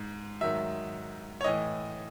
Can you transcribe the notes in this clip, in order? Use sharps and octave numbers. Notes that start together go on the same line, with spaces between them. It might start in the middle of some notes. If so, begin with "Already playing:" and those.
Already playing: G#2
G#2 D#3 F#3 E5
C#5
A2 E3 D#5